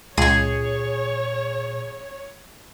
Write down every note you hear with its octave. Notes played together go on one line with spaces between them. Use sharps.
C#2 A#2 G#4 C#5 C#6